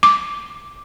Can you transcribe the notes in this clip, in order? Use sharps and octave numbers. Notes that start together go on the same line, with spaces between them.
D6